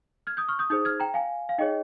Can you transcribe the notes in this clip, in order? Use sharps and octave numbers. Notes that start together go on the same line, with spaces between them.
F6 G#6
D#6 G6
C#6 F6
D#6 G6
D#4 G#4 C5 D#6 G6
F6 G#6
G5 A#5
F5 G#5
F5
D#4 G#4 C#5 D#5 G5